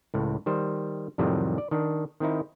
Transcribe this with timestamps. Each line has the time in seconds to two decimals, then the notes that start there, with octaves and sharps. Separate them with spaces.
0.14 C#2 A2
0.46 D#3 G3 C5
1.18 F2 A2 C3 D#3 F#3 G3
1.58 D5
1.71 D#3 D4
2.20 D#3 C4 D#4 E4